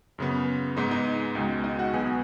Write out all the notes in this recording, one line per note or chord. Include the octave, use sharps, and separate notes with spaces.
F#2 C#3 B3
G#2 G#3 B3 D#4 D#5
D#4 D#5
C#2 B2 G#3
D#4 D#5
F#4 F#5
B1 B2 B3 G#4 G#5